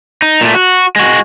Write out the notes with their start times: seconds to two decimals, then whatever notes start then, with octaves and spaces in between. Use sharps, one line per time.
0.22 D#4
0.41 A#2 A3
0.54 F#4
0.96 G#3 F#4